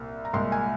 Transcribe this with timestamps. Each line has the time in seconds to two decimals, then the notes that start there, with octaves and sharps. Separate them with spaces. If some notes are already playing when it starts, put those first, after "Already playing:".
Already playing: C2 A#2
0.25 A#5
0.33 C2 A#2 G#3 C6
0.52 G#5